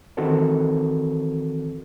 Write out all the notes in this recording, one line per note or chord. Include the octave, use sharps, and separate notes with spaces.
D#3 E3 C4 F#4 A4 A#4